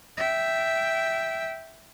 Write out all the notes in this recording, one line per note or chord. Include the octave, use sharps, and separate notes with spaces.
E5 G5